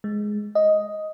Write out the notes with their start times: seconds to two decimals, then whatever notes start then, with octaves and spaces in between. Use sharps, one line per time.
0.04 G#3
0.55 D#5